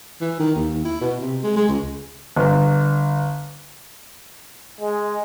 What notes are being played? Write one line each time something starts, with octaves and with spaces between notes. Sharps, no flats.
E3
D#3
D#2
E4
B2
C3
G#3
G#3
C#2
G1
G#3